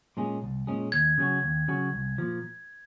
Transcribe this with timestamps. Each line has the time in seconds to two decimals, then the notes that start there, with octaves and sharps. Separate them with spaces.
0.17 A#2 G#3 C#4 G#4
0.42 C2
0.67 A#2 G#3 C#4 G#4
0.92 D#2 G#6
1.18 C#3 F#3 C#4 F#4
1.43 D#2
1.68 C#3 F#3 C#4 F#4
1.93 C2
2.18 A#2 F3